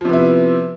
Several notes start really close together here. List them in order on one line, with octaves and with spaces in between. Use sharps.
F3 C3 B3 E4